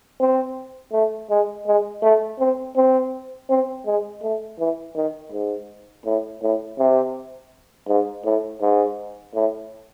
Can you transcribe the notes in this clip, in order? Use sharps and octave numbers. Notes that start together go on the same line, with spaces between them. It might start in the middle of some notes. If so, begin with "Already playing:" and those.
C4
A3
G#3
G#3
A3
C4
C4
C4
G#3
A3
E3
D#3
G#2
A2
A2
C3
G#2
A2
G#2
A2